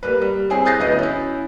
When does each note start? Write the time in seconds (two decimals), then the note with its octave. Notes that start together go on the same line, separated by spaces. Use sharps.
0.03 G3 A#3 B4
0.22 G3
0.50 C4 E4 G#4 C#5
0.65 D#6 F#6 G6 A6 A#6 C7
0.79 D2 F#3 B3 E4 D#5 D#6
0.99 C#4 E4